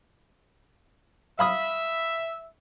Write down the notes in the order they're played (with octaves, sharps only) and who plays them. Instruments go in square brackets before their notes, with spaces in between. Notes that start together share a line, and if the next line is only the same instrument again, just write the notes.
[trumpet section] E5 [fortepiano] F5 B5 D#6